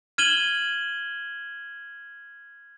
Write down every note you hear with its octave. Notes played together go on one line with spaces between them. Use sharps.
F6 G#6 D#7 E7 F#7 G7